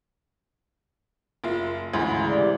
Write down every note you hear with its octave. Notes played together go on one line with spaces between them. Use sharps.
F#1 F4 E5
D2 G#2 C#3 E3
C3 D5